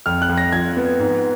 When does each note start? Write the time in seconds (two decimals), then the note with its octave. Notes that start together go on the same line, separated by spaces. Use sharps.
0.06 F2 F6
0.22 F#6
0.29 F2
0.38 A#6
0.52 F3 G#6
0.77 B3
0.99 G#2